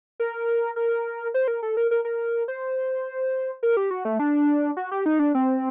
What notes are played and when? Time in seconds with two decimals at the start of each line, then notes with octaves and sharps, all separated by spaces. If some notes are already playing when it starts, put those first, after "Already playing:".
0.20 A#4
0.76 A#4
1.34 C5
1.48 A#4
1.63 A4
1.77 A#4
1.91 A#4
2.05 A#4
2.48 C5
3.63 A#4
3.77 G4
3.91 F#4
4.05 A3
4.19 D4
4.77 F#4
4.91 G4
5.06 D#4
5.19 D4
5.35 C4